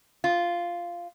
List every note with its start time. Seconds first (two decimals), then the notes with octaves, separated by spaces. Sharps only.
0.24 F4